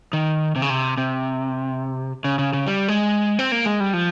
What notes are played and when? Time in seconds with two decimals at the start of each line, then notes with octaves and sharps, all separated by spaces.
0.13 D#3
0.56 C3
0.62 C#3
0.70 C3
0.98 C3
2.24 C#3
2.39 C#3
2.53 C#3
2.67 G3
2.88 G#3
3.39 C4
3.52 A#3
3.66 G#3
3.80 G3
3.94 F3